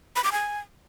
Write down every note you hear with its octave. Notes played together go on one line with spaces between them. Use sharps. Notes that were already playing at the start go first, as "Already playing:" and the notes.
B5
D6
G#5